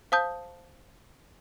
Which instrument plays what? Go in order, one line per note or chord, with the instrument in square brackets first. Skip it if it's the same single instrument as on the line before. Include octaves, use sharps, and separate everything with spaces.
[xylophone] C5 F5 A5 D#6 G6